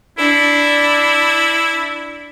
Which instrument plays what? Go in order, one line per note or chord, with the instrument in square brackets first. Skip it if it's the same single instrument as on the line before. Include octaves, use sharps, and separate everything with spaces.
[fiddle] D4 [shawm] E4